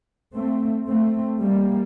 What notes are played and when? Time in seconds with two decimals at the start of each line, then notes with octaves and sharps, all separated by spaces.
0.34 A3 C4
0.87 A3 C4
1.41 G3 A#3